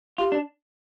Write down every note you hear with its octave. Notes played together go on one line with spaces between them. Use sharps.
F4 G4
D4